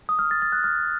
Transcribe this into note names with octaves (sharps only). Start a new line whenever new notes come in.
D#6
F6
A6
A6
F#6
F6